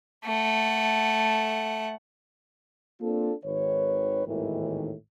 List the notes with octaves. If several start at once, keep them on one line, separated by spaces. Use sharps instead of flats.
A3 F#5
A#3 C4 D4 F4 A4
G#1 D#3 B4 C#5
G#1 D#2 A2 D#3 E3